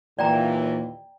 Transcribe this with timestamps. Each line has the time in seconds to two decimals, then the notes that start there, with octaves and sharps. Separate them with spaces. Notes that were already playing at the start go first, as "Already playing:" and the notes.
0.19 D#2 A#2 E3 D5 G5 A#5